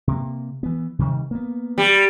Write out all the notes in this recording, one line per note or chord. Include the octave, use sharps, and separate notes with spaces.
C3 A#3
E3 B3
C3 D#3 G3
A#3 B3
G3